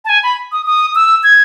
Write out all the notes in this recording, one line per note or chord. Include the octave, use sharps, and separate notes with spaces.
A5
G#5
B5
D#6
D#6
E6
G#6